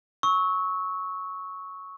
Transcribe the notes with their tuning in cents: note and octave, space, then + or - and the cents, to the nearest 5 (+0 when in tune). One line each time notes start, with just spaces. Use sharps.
C#6 +0 E6 -30